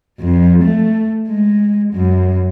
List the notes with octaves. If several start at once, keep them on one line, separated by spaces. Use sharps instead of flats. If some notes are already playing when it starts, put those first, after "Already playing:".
F2
A3
G#3
F#2